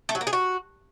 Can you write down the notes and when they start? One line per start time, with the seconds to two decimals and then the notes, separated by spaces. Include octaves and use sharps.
0.09 A3
0.15 F#3
0.21 A#3
0.27 G#4
0.33 F#4